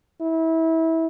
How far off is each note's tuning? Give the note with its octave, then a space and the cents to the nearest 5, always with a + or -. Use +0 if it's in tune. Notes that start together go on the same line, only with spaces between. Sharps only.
E4 -25